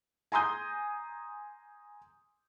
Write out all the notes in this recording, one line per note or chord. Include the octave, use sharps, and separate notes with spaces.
G#5 A#5 C6 D#6 G6